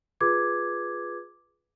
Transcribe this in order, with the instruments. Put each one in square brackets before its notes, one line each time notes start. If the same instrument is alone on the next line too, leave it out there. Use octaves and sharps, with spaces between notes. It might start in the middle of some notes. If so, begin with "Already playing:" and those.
[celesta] F4 G#4 B4 D6 G#6